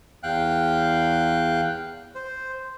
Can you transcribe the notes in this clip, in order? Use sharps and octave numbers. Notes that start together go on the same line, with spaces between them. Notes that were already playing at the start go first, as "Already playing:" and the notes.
E2 F5 G5 F#6
C5